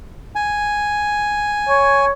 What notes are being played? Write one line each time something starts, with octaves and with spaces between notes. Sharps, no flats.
G#5
C#5